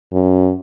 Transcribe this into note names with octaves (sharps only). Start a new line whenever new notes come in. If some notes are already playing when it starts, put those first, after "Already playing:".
F#2